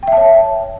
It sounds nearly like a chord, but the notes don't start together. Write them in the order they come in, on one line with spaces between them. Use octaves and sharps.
G5 E5 A5 C#5